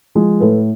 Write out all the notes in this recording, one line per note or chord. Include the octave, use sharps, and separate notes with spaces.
F3 G#3
A2 A4 B4